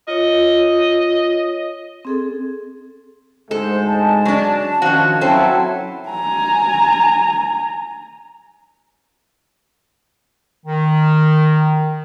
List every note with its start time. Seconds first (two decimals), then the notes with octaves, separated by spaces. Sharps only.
0.08 F4 C#5 D#5
2.05 C4 G#4 A4
3.51 D2 G#2 G#3 A4 C5
3.87 A5
4.25 F#3 D4
4.82 D#3 F3 C#4 F#4
5.21 F#3 C4 C#4 E4 A4 C5 G5 A5
6.10 G#5 A#5
10.66 D#3